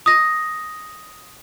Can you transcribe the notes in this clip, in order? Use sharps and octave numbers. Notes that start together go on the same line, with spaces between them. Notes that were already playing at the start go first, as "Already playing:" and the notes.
D#6 A#6